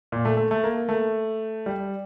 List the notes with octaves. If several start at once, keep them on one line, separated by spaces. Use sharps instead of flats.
A#2
A3
A3
A3
A#3
A3
G3